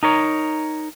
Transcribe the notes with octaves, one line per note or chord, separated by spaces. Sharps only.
D#4 A#4 C#5